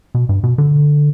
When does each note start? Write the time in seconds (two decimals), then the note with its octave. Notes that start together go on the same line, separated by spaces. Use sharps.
0.15 B2
0.29 G2
0.44 B2
0.58 D3